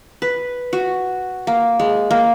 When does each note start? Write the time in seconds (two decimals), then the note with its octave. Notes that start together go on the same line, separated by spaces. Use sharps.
0.22 B4
0.73 F#4
1.47 A#3
1.80 G#3
2.11 A#3